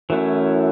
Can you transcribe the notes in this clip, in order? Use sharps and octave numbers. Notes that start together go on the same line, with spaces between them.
F#2 E3 A3 C#4 E4